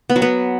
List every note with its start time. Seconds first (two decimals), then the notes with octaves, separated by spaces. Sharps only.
0.10 B3
0.16 F#3
0.22 B3